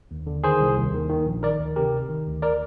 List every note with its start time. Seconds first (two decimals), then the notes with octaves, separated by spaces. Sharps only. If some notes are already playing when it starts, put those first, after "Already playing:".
0.11 D#2
0.27 D3
0.44 D#3 G#4 C5
0.60 C2
0.77 D#2
0.94 D#3
1.10 D#3
1.27 A#1
1.43 D#3 A#4 D5
1.59 D2
1.76 C3 G4 A#4
1.92 G1
2.09 D#3
2.27 D2
2.42 A#4 D5